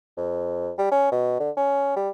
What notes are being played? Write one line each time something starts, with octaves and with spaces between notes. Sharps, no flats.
F2
G3
C#4
B2
D3
C#4
G3